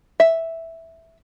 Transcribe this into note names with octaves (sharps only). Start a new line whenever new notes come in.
E5